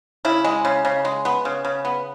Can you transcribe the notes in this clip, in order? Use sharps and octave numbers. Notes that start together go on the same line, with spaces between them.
C#3 E4
G#3
C#3
C#3
G#3
B3
C#3
C#3
B3